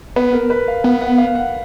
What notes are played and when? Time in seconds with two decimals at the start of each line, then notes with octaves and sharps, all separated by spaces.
0.16 B3 B4
0.33 A#4
0.50 B4
0.68 F5
0.84 B3 F#5
1.01 F#5
1.18 F5
1.35 F#5